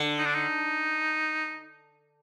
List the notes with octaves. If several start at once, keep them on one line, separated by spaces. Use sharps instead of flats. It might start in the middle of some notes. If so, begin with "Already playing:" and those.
Already playing: D3
D#4
D4
D#4